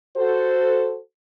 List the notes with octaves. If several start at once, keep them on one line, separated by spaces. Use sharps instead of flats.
F#4 A4 C5